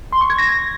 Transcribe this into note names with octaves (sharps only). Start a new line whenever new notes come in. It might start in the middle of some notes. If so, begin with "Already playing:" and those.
C6
C#6
G#6
A#6